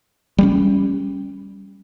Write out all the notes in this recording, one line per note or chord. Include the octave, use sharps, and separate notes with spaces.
G3 A3 C#4